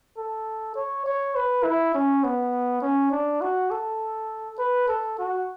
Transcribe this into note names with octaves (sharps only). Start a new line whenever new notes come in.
A4
C#5
C#5
B4
E4
C#4
B3
C#4
D4
F#4
A4
B4
A4
F#4